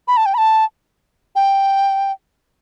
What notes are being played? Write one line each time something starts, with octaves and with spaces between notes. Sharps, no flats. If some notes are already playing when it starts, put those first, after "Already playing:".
B5
A5
G5
B5
A5
G5